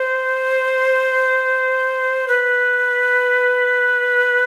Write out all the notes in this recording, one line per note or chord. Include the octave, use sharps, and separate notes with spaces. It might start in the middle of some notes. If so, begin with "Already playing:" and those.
Already playing: C5
B4